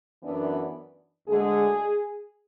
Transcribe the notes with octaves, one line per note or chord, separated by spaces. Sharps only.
F#2 E3 B3 D4
D2 D3 G#3 G#4